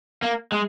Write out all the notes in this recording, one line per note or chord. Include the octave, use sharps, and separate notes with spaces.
A#3
G#3